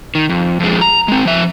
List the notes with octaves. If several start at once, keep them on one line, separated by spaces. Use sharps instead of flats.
D#3
F2
F2 G#3
A#5
G#3 C4
F3 E5